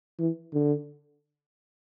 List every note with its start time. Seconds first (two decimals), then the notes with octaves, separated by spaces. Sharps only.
0.19 E3
0.53 D3